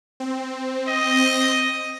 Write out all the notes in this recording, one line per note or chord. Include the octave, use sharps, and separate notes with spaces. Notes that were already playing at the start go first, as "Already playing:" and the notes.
C4
D#5